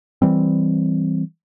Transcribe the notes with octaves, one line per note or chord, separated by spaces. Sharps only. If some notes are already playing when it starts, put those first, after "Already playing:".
E3 G3 C4